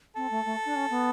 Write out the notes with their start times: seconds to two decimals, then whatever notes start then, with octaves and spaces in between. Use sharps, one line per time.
0.16 C4 A4
0.31 A3
0.45 A3
0.65 D4
0.75 C#4
0.90 B3